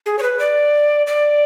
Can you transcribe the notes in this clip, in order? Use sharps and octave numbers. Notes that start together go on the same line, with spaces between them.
G#4
C#5
B4
D5
D5